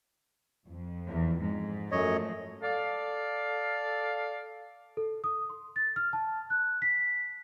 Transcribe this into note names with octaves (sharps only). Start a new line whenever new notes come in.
F2
E2
G#2
F#2 F3 A3 C#5 D#5
A4 D5 F5
A4
D#6
C6
A6
F6
A5
F#6
B6